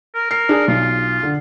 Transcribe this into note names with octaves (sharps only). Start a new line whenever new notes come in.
A#4
A#4 C7
D4 G#4
B1 F4
D3